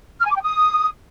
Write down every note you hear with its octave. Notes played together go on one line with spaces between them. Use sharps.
F6
G#5
D6
G5
D#6